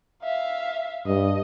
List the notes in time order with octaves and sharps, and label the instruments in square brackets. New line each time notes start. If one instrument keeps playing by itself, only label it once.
[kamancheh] E5 F5
[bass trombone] G2 [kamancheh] D#5